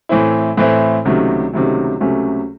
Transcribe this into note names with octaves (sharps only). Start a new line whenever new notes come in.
A2 E3 C4 E4
A2 E3 C4 E4
C#2 C3 D#3 F#3 A3
C#2 C3 D#3 F#3 A3
C#2 C3 F#3 A3 C#4